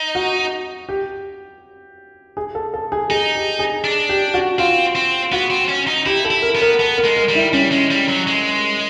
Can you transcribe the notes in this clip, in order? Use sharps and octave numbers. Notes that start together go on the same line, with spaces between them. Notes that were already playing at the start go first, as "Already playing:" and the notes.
Already playing: D#4
F#4
G4
G#4
A4
A4
G#4
D#4 G#4
G4
G#4
D4
G4
F#4
C4 F4
C4
B3 F#4
C4
C#4
D#4
E4 G4
A4
E4
A#4
B3
A#4
B3 A4
A#4
G#3
A#4
G3
E4
G3 C#4
G#3
G3
F#3
G#3